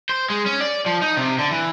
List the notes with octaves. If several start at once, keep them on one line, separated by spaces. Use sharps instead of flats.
C5
G#3
C#4
D5
F3
D#4
C3
D3
E3